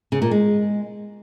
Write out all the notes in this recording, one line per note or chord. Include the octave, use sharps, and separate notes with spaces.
C#3
A#2
G#3